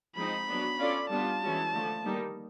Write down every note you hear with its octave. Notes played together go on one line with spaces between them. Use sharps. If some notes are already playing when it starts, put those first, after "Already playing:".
F3 G#3 C4 D#4 B5
F#3 B3 D4
C#4 F4 A4 D5
G3 B3 D4 F4 A5
E3 G#3 C#4 F#4
D3 F3 A3
D#3 G3 A#3 D#4